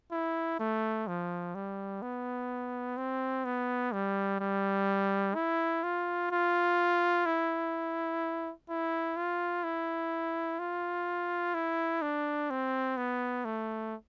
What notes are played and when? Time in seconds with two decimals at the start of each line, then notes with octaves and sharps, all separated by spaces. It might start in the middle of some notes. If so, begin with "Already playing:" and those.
0.12 E4
0.59 A3
1.07 F3
1.55 G3
2.02 B3
2.97 C4
3.45 B3
3.92 G3
4.40 G3
5.35 E4
5.83 F4
6.31 F4
7.26 E4
8.69 E4
9.17 F4
9.64 E4
10.59 F4
11.54 E4
12.02 D4
12.50 C4
12.97 B3
13.45 A3